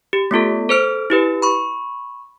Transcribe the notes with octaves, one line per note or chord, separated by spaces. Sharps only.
G4
A3 B3 F4 A4
A4 C5 F6 D7
E4 G4 B4
B5 C#6